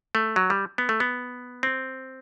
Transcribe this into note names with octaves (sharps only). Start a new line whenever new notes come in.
A3
F#3
G3
B3
A3
B3
C4